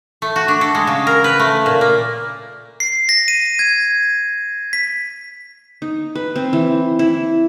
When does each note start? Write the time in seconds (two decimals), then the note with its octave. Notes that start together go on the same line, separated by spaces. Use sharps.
0.22 A3
0.36 F#4
0.48 D4
0.61 A4
0.75 G#3
0.87 C#3
1.07 A#4
1.24 B4
1.39 A3
1.66 A#2
1.81 A#3
2.80 C7
3.09 A#6
3.28 D#7
3.59 G#6
4.73 B6
5.82 D#4
6.15 B4
6.36 C4
6.53 E3
6.99 E4